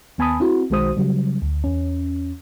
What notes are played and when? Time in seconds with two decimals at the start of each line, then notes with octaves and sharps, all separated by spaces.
0.18 D#2 B3 G#5 A5 B5 D#6
0.40 C4 E4 F#4
0.70 B1 D#3 G#3 F#4 C5 D#6
0.97 C#3 F#3 G3
1.42 D2
1.64 E2 C#4